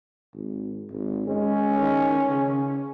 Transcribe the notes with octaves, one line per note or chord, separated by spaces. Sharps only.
G#1
G#1
G#3 C#4
D#3
C#3